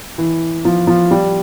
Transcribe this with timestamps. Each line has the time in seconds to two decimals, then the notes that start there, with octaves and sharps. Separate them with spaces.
0.18 E3
0.65 F3
0.87 F3
1.11 G3